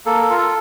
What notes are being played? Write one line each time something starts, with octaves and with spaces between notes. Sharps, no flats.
A#3 A4
A4
F4 A#4
A4